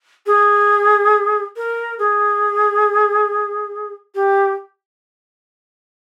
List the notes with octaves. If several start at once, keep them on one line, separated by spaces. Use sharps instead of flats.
G#4
A#4
G#4
G4